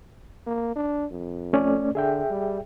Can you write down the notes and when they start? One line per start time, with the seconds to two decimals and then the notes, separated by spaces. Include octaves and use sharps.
0.47 A#3
0.76 D4
1.12 F2
1.53 A3 C#4 D5
1.95 D3 G#4 E5 G5
2.30 G3